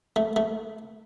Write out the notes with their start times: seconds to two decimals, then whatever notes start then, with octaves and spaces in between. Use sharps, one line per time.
0.16 A3
0.36 A3